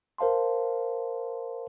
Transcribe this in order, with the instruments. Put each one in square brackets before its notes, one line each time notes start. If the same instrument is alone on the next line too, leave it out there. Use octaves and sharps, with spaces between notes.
[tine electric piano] A#4 C5 F5 A5 C6